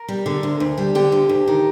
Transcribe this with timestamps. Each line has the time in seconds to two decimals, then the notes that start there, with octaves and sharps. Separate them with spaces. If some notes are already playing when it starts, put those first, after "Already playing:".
Already playing: A#4
0.08 G3
0.26 D3
0.43 D2
0.60 D2
0.78 G3
0.95 D3 G4
1.12 D2
1.29 D2
1.48 D#3